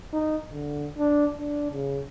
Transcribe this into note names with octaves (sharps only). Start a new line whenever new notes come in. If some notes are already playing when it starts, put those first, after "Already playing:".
D#4
D3
D4
D4
C#3